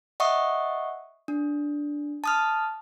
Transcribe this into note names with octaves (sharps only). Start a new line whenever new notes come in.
D#5 E5 F#5 C#6 D#6
D4
A5 D#6 F6